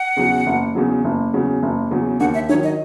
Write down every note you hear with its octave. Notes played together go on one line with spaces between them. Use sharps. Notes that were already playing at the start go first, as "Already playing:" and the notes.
Already playing: F#5
E2 C#3 F#3
F#1
E2 C#3 F#3
F#1
E2 C#3 F#3
F#1
E2 C#3 F#3
D#2 F#5
E5
D#3 F#3 C#5
D#5